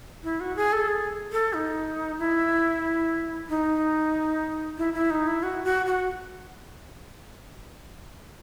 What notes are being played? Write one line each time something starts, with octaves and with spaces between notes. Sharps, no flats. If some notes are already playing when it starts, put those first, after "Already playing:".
E4
F#4
G#4
A4
G#4
A4
D#4
E4
D#4
E4
E4
D#4
E4
F#4
F#4
F#4